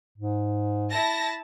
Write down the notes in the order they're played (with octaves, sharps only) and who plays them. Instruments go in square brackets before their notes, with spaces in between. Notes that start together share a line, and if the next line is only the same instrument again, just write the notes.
[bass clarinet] G#2
[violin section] E4 A5 A#6